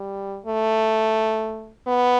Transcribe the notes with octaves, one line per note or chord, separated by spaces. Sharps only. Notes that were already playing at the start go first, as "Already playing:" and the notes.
Already playing: G3
A3
B3